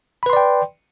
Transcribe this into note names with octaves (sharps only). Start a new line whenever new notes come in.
B4 D5 G5 B5 C6